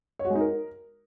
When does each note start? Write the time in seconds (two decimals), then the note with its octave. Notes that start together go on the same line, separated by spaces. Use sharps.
0.19 C#5
0.25 F#4
0.30 G#3
0.35 D#4
0.41 A#4